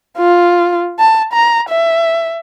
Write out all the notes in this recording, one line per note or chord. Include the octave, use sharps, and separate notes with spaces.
F4
A5
A#5
E5